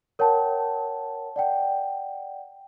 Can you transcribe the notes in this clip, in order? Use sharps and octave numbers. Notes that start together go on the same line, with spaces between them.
A#4 C#5 F#5 G5 A5
D5 F#5 G5